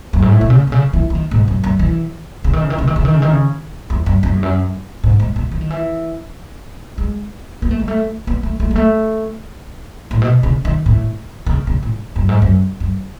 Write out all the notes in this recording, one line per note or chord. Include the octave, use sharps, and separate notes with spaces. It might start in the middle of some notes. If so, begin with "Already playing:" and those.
F#2
G#2
A2
B2
C#3
B2
C#3
E3
E3
D#3
G#2
F#2
F#2
E3
C#3
D#3
C#3
D#3
C#3
D#3
C#3
D#3
C#3
D#3
C#3
E2
F#2
F#2
E2
F#2
G#2
G#2
D#3
E3
D#3
E3
G#3
B3
A3
G#3
A3
B3
A3
A3
G#3
A3
A2
B2
C#3
D#3
A2
D#3
C#3
C#3
A2
F#2
G#2
F#2
F#2